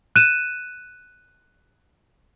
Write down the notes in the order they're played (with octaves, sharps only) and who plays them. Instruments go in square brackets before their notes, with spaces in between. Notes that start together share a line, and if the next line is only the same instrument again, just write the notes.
[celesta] F#6 D#7 E7